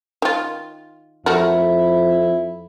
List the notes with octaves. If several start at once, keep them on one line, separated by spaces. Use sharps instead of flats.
D#3 F4
F2 A3 E4 F#4 A#4